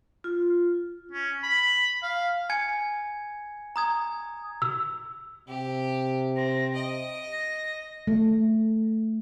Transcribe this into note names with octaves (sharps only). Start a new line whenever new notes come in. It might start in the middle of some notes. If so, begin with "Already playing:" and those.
F4
C#4
B5
F5
G#5 G#6 C#7
A#5 D#6 G#6
E6
C3 G4
C4 A#6
D#5 D7
A#6
A3